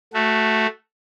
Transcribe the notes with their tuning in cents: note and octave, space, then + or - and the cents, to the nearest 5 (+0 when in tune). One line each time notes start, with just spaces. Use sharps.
A3 +0 F#4 +0